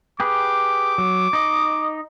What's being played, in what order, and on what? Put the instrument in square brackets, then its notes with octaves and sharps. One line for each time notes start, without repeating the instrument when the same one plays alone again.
[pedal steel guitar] G4 G#4 B4 [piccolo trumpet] D6
[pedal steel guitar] F#3
D#4 D#5